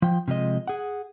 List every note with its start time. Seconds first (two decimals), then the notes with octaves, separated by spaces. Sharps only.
0.02 F3 G5
0.28 C3 F3 G#3 D#5
0.68 G#4 F#5